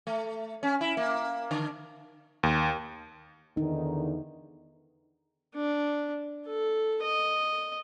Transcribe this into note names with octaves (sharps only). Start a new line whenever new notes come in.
A3
C#4
E4
A#3
D3
D#2
E2 D3 D#3 D#4
D4
A4
D#5